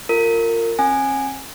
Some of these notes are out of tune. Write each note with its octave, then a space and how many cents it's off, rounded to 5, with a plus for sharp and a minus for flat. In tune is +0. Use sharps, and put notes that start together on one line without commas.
F4 +0 A#4 -25
C4 +45 G#5 +0